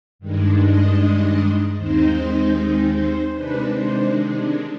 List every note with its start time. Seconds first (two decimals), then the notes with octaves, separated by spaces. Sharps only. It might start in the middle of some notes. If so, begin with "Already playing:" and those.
0.19 G2 D#3 G#3 D4
0.59 D#5
1.77 D#2 D#3 G#3 C4 D#4 C5
2.95 C5
3.34 C3 D#3 G#3 D4 B4
3.74 C5